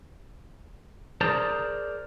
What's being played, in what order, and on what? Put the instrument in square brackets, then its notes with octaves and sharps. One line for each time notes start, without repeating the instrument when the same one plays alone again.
[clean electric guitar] G#4 A#4 C5 D5 A5 A#5